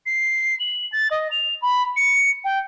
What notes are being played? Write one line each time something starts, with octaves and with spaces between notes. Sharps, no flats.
C7
F#7
A6
D#5
F7
B5
C#7
G5